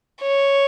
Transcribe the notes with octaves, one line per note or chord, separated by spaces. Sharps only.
C#5